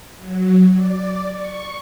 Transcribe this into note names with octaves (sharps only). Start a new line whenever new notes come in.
F#3
D5
C#6